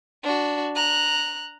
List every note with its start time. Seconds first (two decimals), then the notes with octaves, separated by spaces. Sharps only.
0.23 D4 F#4
0.76 A#5 F#6